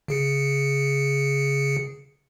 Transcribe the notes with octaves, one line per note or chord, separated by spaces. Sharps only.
C#3 G#4 C#7